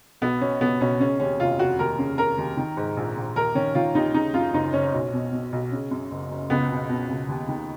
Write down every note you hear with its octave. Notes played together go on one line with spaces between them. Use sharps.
B1 B3
B2 C#4
B2 B3
B1 C#4
C#3 C#4
D#2 C#4
F1 F4
F1 F#4
D#2 A#4
C#3
C#3 A#4
D#2
D#3
G#2
A#1
A#1
D#2 A#4
D#3 C#4
D#3 F4
D#2 D#4
C#3 D#4
F#2 F4
F#1 D#4
F#1 C#4
B1
B2
B2
B1
C#3
F#2
F#1
F#1
C#2 B3
B2
B2
C#2
D#2
D#3